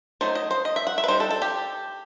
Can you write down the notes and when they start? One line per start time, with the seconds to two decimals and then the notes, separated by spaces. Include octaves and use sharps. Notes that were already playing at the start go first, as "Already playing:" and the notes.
0.21 F#3 A3 D#4 C5
0.35 D#5
0.51 C5
0.65 D#5
0.76 E5
0.87 F#5
0.98 E5
1.04 B4
1.08 G3 D#4 C5
1.20 A4
1.31 A4
1.42 G4